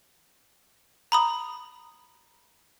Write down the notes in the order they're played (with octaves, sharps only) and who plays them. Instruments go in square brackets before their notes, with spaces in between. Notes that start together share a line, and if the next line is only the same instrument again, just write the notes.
[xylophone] A#5 B5 D#6